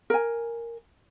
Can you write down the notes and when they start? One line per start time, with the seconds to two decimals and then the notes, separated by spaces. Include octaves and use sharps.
0.10 A#4 G#5